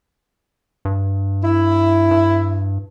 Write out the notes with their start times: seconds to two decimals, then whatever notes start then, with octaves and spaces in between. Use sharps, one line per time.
0.85 G2
1.44 E4
2.11 G2